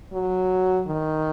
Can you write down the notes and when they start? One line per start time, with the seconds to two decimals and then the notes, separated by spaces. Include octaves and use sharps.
0.13 F#3
0.87 D#3